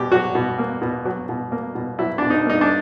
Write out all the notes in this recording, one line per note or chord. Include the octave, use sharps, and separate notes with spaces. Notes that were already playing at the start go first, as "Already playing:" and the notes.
Already playing: B2 G4
F#3 F#4
B2
A#3
B2
F#3
B2
A#3
B2
F#3 E4
B2 D4
D#4
A#3 D#4
D4